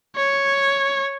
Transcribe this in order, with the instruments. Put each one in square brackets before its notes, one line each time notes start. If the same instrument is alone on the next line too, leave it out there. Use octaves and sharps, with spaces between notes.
[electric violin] C#5